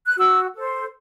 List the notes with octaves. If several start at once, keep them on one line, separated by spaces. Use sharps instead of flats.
F#6
F#4 E6
A4 C5